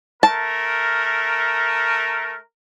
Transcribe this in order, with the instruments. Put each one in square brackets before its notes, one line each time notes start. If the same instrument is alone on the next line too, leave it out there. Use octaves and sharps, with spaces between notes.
[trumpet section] A3 A#4 [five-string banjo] A5